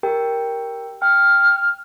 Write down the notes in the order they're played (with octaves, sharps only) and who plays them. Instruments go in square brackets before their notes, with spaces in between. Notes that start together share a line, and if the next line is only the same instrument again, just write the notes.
[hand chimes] G4 A#4 G5
[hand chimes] G5 [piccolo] F6